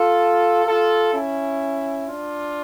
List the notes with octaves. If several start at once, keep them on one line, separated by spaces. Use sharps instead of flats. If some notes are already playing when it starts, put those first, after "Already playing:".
Already playing: F4 A4
F4 A4
C#4 E4
D4 F4